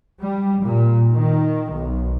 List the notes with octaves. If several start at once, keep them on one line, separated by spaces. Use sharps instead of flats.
G3
A#2
D#3
B1